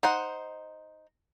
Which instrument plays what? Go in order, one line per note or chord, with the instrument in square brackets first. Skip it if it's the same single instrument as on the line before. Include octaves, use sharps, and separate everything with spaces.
[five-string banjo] D#4 C5 F#5